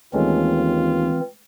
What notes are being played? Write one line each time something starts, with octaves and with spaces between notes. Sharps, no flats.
D#2 E3 G#3 A3 C4 C#4 F4